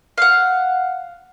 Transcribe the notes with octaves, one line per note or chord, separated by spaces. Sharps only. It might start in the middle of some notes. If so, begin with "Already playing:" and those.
F5 F#5